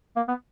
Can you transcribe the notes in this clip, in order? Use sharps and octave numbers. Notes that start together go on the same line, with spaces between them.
A#3
B3